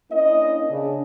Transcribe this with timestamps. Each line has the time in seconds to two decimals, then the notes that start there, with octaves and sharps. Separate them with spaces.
0.11 A#3 C#4 D4 E4 D#5
0.68 C#3 D4